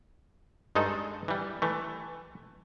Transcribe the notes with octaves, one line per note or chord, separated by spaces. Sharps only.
G2 G#3 D#4 A4
E3 G3
E3 A3